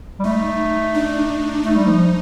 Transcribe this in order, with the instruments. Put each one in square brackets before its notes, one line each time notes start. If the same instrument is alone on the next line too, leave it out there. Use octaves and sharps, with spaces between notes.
[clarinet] G3
[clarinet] A3 [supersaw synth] D#4
[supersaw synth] D4
[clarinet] A3 [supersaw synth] D#4
[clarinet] G3
F3